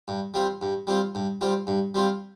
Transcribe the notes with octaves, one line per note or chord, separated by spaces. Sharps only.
G2
G3 C4 F4
G2
G3 C4 F4
G2
G3 C4 F4
G2
G3 C4 F4